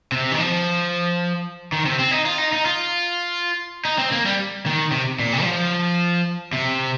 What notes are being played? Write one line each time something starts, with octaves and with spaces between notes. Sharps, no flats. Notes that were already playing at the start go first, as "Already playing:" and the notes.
C3
D#3
F3
D#3
C3
C4
D#4
F4
D#4
D#4
F4
D#4
C4
A#3
G3
D#3
C3
A#2
C3
G3
F3
C3